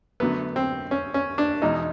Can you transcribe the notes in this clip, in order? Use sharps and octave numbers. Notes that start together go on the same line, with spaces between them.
F#2 D3 F#3 A3 B3
C4
C#4
C#4
D4
E2 B2 G#3 D#4